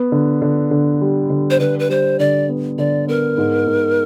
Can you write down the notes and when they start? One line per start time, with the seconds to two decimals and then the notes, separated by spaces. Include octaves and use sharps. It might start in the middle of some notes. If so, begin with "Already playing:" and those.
Already playing: B3
0.12 D3
0.42 D3
0.71 D3
1.01 G3
1.30 D3
1.50 C5
1.60 D3 B4
1.79 B4
1.89 G3 C5
2.19 D3 D5
2.49 B3
2.78 D3 D5
3.07 B3 A#4
3.38 G#2
3.67 G#2